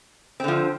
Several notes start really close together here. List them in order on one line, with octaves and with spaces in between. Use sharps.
C4 D3 F3